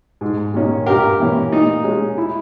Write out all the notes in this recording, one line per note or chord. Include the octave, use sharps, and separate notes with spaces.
G#2
D#3 A#3 C#4
G2 G4 A#4
E3 A#3 C#4
A#2 D#4
G#3 C#4
E4